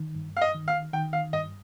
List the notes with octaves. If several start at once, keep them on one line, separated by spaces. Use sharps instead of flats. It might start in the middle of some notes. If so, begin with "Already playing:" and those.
Already playing: D#3
G2
F5
D#5
D#3
F5
D#3 G5
F5
G2 D#5